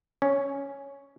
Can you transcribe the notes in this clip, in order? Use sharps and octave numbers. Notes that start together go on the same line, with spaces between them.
C#4